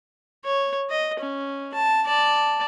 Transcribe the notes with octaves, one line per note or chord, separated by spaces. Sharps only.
C#5
D#5
C#4
A5
D5 A5